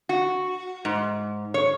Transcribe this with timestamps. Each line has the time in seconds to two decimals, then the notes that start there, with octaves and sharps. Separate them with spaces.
0.09 F#4
0.85 G#2
1.54 C#5